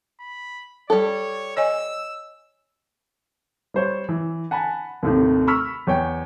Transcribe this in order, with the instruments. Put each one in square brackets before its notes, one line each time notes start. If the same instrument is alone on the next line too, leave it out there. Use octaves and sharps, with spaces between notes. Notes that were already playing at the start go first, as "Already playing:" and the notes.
[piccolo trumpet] B5
[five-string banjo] G3 A4 [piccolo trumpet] C#5
[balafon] C#5 D#5 G#5 [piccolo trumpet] E6
[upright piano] G3 C5 C#5
E3
F#5 G#5 A5 B5
D#2 A2 C3
B5 C#6 E6 F6 B6
E2 C#5 G5